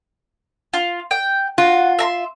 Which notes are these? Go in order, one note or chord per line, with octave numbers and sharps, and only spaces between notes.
F4
G5
F4 F#4
E5 A#5 C6